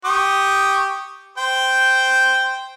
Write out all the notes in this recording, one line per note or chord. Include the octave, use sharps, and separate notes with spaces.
G4 C#6 D#6
C5 G5